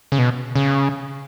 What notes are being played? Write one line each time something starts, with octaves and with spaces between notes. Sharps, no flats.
C#3
B2
C#3